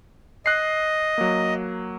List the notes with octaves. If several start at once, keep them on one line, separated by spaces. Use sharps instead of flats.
D#5 F#6 C7
F#3 A#3